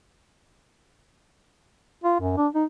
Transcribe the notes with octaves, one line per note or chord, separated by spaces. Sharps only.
F4
F#2
D4
D#4